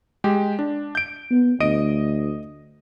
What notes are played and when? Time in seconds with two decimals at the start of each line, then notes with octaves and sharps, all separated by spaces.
0.24 G#3 G4
0.59 D4
0.95 G6 D7
1.31 B3
1.60 D2 D#5 D7 D#7